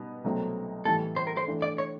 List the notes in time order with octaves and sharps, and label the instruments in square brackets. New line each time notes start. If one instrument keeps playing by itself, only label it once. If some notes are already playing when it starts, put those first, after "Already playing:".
Already playing: [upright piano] B2 G3 B3 D#4
C2 B2 F#3 A3 C4
[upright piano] A2 E3 G3 [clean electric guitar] A4
[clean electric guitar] C5
A#4
C5
[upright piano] E3 A3 D4
[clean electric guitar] D5
C#5